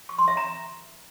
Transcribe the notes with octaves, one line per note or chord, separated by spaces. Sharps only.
C#6
C6
E5
A#5